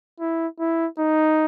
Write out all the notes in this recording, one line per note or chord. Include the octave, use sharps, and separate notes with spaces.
E4
E4
D#4